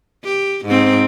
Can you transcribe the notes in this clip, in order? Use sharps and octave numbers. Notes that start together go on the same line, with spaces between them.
G4
G#2 C4